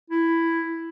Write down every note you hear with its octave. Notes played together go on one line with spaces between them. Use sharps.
E4